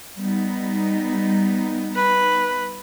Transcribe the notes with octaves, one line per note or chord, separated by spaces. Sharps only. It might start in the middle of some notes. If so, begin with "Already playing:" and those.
G3 B3 D#4
B4